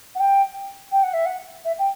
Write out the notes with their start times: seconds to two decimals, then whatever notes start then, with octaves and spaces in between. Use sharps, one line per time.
0.15 F#5
0.19 G5
0.91 G5
1.03 F#5
1.13 E5
1.25 F#5
1.64 E5
1.78 G5